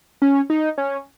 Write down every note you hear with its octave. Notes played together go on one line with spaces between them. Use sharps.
C#4
D#4
C#4